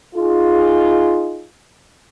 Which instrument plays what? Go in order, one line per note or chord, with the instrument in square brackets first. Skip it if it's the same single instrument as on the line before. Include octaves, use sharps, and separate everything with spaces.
[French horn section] D#4 F4 G#4